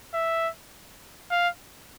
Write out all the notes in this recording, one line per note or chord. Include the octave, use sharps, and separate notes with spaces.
E5
F5